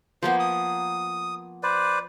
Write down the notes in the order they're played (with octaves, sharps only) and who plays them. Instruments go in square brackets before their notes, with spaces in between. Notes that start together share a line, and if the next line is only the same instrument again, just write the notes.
[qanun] F3 A#3 B3 [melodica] C5
[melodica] D#6
B4 C5 D5